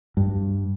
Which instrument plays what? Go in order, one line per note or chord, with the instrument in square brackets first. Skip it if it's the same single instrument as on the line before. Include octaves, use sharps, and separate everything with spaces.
[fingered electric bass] G2